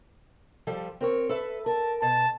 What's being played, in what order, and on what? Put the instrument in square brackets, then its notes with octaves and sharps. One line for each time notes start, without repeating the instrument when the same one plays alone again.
[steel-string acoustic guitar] F3 G3 A4
C4 A#4 C#5
A4 B4 E5
[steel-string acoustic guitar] A#4 [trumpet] A5
[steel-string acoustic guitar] B2 [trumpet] A5